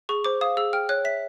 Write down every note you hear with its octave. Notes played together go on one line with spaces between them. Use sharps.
G#4 C#6
C5 D6
F5 D#6
G#4 E6
G5 F6
C#5 F#6
E5 B6